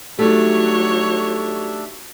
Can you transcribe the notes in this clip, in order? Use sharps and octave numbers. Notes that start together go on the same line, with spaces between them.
F#3 G3 A3 D4 D#4 G4 C#5 E5